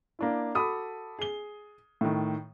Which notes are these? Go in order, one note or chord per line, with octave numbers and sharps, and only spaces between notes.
A#3 D4 E4
F#4 A4 B5 D6 D#6
G#4 G7
A2 D#3